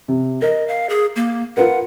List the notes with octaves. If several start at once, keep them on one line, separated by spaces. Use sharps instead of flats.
C3
A#4 D#5
F5
G#4
A#3
F4 A#4 B4 F#5